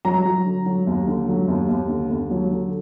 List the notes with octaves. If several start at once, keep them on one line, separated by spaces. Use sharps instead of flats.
F#3 A#5
F#3
D3
F#3
D#2
D3
F#3
D#2
D#2
D3
D#2
F#3
D3